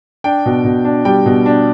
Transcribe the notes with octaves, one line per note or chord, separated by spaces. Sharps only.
D4 G5
B2
B2
D4
G3 G5
B2
D4